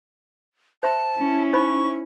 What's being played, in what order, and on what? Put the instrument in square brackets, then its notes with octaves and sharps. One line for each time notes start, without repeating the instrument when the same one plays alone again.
[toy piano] C5 E5 C6 [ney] A5
[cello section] C#4 E4
[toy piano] D#4 C5 B5 [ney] C#6